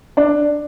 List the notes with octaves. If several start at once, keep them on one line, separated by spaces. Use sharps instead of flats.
D4